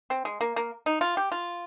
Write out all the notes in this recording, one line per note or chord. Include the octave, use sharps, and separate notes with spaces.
C4
G#3
A#3
A#3
D#4
F4
G4
F4